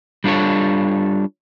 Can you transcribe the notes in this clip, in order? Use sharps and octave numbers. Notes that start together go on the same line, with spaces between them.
G3 D4 F4 A4 C#5